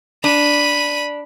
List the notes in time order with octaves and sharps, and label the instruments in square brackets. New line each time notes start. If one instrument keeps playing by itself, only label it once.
[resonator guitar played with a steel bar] D4 [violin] B5 D#7